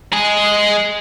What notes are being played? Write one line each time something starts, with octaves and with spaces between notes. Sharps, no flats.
G#3 G#4